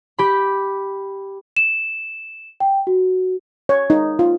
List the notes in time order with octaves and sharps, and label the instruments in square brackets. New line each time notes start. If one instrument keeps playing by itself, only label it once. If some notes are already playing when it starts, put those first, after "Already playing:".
[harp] G4 B5
[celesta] E7
G5
F#4
[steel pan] C#5
D#4
F4